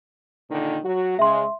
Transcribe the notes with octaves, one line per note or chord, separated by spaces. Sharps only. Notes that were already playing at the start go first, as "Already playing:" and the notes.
A#2 D3 D#3
F#3 F#4
C#3 G#3 E5 C6